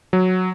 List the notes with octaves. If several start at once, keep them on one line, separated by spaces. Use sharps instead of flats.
F#3